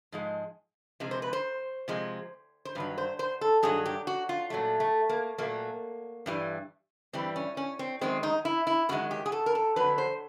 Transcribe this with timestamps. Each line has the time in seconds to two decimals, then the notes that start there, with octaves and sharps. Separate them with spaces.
0.12 G#2 F3 G#3
1.00 C3 F3 G#3
1.11 C5
1.22 B4
1.33 C5
1.88 C3 F3 G#3
2.65 C5
2.75 G2 D#3 F#3 B4
2.98 C5
3.19 C5
3.41 A4
3.63 G2 D#3 F#3 G#4
3.86 G4
4.07 F#4
4.29 F4
4.50 A#2 F#3 A3
4.80 A3
5.09 A#3
5.38 A#2 F#3 A3 A#3
6.26 G2 E3 G3
7.13 G2 E3 G3 C4
7.36 C#4
7.57 C#4
7.79 C4
8.01 F#2 D#3 G#3 C4
8.23 D#4
8.45 E4
8.67 E4
8.89 F#2 D#3 G#3 F#4
9.11 G4
9.26 G#4
9.32 A4
9.46 A#4
9.55 A4
9.76 F2 D3 F#3 B4
9.98 C5